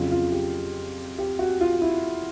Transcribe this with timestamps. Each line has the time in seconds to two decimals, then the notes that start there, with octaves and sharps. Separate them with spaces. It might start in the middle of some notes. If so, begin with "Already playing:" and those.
Already playing: F2 C#3 F#3 F4
0.11 F4
0.32 G4
1.18 G4
1.39 F#4
1.61 F4
1.82 E4